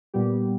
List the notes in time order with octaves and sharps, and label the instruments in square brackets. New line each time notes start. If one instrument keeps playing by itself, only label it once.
[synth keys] A#2 G3 B3 G4